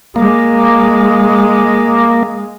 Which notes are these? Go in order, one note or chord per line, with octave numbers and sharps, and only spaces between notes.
G#3 A#3